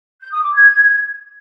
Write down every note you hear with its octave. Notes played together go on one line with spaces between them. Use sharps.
G6
D#6
D6
G#6